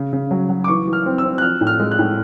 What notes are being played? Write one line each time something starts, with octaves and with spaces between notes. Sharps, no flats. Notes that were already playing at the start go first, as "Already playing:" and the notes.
Already playing: C#3
C#3
F#3
F#3
D6
E3 C#6
E3
F6
C4
E6
C4
F#6
F3 F6
A2
F6
G#3
F#6
A2